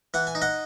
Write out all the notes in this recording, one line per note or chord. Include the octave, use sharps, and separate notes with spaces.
E3 F#5
G#5
D#4
D#5 F#5